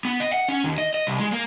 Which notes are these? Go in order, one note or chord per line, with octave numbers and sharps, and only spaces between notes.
B3
D#5
F#5
C#4
D#2
D#5
D#5
C2
G#3
A#3